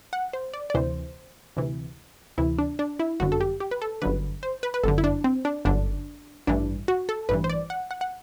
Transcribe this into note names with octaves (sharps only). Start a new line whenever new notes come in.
F#5
C5
D5
D5
D2 C3 E3 C5
D2 C3 E3
D2 C3 E3 E4
D4
D4
E4
G1 F#2 D3 F#4
A4
G4
G4
B4
A4
G1 F#2 D3 B4
C5
B4
B4
G1 F#2 D3 A4
E4
D4
C4
D4
G1 F#2 D3 D4
A1 G2 E3 D4
F#4
A4
A1 G2 E3 B4
C5
D5
F#5
F#5
F#5